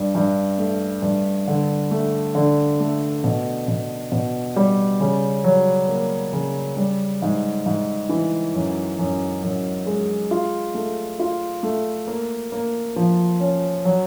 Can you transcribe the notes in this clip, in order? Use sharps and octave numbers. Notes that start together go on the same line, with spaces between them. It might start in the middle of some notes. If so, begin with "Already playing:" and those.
Already playing: G2
G2
A3
G2
D3
A3
D3
A3
B2
B2
B2
G3
C#3
F#3
A#3
C#3
G3
G#2
G#2
E3
F#2
F#2
F#2
G#3
F4
A3
F4
A3
A#3
A#3
F3
C#4
F#3